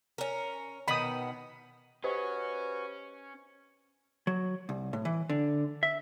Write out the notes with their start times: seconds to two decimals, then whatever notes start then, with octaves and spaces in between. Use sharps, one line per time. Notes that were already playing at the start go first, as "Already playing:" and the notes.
0.18 C#4 A#4
0.88 B2 D#3 B3 B5 D#6
2.04 C#4 F#4 G4 B4 C5 D#5
4.27 F#3
4.69 C2
4.93 A2
5.05 E3
5.30 D3
5.83 E5